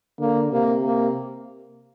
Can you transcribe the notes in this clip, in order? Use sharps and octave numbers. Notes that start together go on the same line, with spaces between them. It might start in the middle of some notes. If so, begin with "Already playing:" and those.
D3 A#3
C3 A#3
A#3